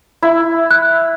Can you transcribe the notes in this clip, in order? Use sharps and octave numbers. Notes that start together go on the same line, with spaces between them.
E4 E6
F#6